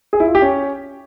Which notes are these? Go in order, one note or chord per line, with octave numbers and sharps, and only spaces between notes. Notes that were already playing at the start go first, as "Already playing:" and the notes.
G#4
E4
F4
G4
C#4